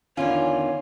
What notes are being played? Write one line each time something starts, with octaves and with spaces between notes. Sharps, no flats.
E2 D3 D#3 C#4 F4 C#5